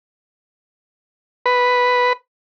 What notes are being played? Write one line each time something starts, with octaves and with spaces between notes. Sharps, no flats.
B4